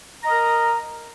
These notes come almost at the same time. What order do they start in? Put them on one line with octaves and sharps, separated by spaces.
A#5 D#5 A#4